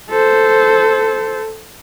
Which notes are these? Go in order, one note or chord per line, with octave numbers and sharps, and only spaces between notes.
A4 C5